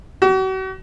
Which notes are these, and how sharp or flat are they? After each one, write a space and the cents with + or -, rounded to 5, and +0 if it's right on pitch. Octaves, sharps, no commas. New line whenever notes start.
F#4 +40